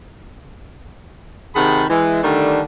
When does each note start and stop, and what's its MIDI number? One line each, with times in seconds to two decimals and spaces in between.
1.55 1.84 48
1.55 1.84 51
1.55 1.84 68
1.55 1.84 78
1.55 1.84 81
1.55 1.84 83
1.90 2.20 52
1.90 2.20 56
2.23 2.61 50
2.23 2.61 51
2.23 2.61 55
2.23 2.61 57
2.23 2.61 62